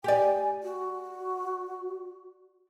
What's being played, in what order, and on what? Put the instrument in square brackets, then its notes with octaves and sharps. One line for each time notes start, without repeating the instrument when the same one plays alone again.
[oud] G4 D5 [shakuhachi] G#5
[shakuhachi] F#4